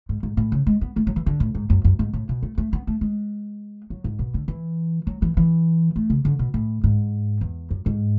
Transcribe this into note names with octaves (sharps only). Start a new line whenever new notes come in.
G#2
G#2
A2
C#3
G#3
B3
A3
F#3
E3
D3
A2
G#2
F#2
F#2
G#2
A2
B2
A3
A3
B3
A3
G#3
F#3
G#2
B2
D3
E3
F#3
E3
E3
A3
C#3
D3
B2
A2
G#2
E2
F#2
G#2